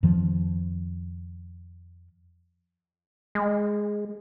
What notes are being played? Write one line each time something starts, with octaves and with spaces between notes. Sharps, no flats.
F2 D#3 F3
G#3